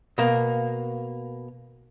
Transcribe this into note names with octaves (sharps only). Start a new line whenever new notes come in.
B2 A#3